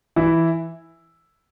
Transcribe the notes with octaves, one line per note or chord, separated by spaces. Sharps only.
E3 E4